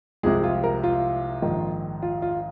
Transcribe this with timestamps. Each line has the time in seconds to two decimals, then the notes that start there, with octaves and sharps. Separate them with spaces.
0.23 C2 C3 F3 G#3 G#4
0.44 F4
0.64 A#4
0.83 F4
1.42 A#1 G#2 D#3 G#3
2.03 F4
2.22 F4